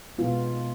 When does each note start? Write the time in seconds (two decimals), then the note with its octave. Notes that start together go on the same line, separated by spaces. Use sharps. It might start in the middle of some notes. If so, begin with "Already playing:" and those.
0.18 B2 G#3 B3 F4